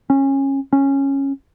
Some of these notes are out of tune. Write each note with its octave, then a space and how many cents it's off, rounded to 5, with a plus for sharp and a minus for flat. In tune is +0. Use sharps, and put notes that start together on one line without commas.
C#4 -20
C#4 -10